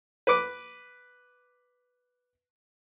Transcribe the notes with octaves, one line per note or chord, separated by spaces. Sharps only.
B4 D6